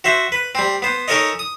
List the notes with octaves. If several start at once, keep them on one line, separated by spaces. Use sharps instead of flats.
F#4 C5 E5
B4
G3 C4
B3 C5
C#4 D#4 A4 A#4 C#5 D#5
D#6